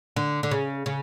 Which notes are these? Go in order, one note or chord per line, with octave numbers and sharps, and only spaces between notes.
D3
D3
C#3
C#3